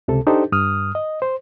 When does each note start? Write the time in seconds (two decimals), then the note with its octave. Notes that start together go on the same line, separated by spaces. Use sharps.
0.08 C#2 C3 A4
0.27 D4 D#4 G4 A4 C5
0.52 G2 D#6 F6
0.95 D#5
1.22 C5